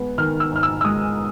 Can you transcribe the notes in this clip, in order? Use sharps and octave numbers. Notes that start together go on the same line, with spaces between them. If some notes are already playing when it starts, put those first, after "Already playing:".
Already playing: G#3 B3
D#3 F6
E6
G#2 F6
E6
E6
G#3 D#6